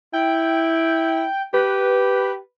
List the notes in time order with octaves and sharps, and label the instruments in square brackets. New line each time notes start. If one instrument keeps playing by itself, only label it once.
[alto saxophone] E4 [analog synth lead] G5
[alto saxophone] G4 [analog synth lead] B4